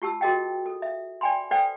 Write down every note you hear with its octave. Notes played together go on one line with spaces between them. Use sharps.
F4 G4 A5 E6
F#4 G#4 A#4 D#5 F#5 G5
A4
E5
D5 G5 G#5 B5 C6
A4 B4 C5 D5 F#5 G5